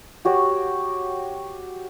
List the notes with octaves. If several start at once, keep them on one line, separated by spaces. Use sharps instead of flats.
F#4 G4 C#5 F#5